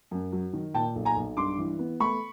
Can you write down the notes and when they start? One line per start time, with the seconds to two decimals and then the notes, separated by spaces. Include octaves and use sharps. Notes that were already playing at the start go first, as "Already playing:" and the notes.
0.11 F#2
0.33 F#3
0.53 D#3
0.74 A#2 G5 A5
0.96 B1
1.05 G#5 A#5
1.16 B1
1.37 G2 C6 D6
1.58 E3
1.79 B3
2.00 A3 B5 C#6